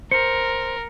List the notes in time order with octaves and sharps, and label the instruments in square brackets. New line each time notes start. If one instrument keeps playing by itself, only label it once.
[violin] A#4 [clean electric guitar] C5 [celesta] C#7